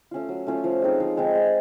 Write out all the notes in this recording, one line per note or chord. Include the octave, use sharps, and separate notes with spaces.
A3 C#4 F4
F#3
A3 C#4 F4
F3
G#3 C4 D#4
F3
G#3 C4 D#4
G#3